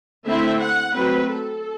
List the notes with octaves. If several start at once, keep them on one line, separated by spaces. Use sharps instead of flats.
D3 A3 C4 E4 E5
F#5
F#3 A3 C4 B4
A4